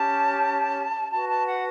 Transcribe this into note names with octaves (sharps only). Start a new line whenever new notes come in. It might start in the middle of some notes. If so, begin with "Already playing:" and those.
Already playing: C#4 G4 C#5 A5
F#4 B4 A5
A5
F#5